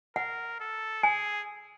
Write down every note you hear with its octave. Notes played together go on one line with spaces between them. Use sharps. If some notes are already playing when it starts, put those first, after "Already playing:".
A#4 F#5
A4
G#4 G#5